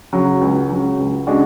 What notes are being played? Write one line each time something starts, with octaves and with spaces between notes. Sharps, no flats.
C#3 F#3
C#2
C#3 F#3
C#2
C#3 G#3 D4 F#4